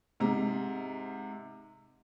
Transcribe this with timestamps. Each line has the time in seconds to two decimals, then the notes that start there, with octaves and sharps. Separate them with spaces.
0.20 G#2 C3 A#5